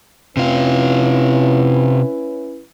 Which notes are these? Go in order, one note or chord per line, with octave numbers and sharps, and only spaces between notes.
C3 C#4 E4 F4 B4